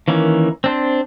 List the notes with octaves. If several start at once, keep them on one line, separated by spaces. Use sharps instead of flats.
D#3 E3 A#3 C#4
C4 D4 C5